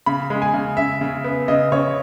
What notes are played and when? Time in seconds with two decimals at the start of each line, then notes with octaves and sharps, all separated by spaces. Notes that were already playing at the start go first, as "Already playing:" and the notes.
0.06 C#3 B5
0.30 G#3
0.42 G#5
0.54 C#3
0.77 C#3 E5
1.01 C#3
1.24 B3
1.48 C#3 D#5
1.72 C#3 C#5